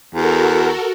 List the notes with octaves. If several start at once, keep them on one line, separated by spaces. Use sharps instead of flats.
E2 F#4 A4 A#4